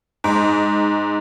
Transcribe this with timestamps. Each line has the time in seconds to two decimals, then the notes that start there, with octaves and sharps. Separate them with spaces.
0.24 G#2